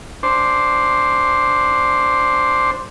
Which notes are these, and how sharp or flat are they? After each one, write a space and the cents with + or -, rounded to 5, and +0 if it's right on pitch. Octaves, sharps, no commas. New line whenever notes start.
D4 +0 C5 +0